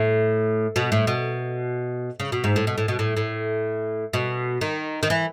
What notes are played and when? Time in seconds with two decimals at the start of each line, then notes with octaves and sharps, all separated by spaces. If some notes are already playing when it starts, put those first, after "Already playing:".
Already playing: A2
0.76 B2
0.92 A2
1.07 B2
2.20 C#3
2.32 B2
2.44 G#2
2.56 A2
2.67 B2
2.78 A2
2.88 B2
2.99 A2
3.17 A2
4.13 B2
4.61 D#3
5.03 D#3
5.10 E3